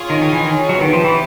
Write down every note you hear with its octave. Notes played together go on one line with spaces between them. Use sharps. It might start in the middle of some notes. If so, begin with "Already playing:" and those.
Already playing: F4 G#4 C#5
D#3
D#3
E3
D#3
F#3
D#3 B3 E4 G4 C5
F3
E3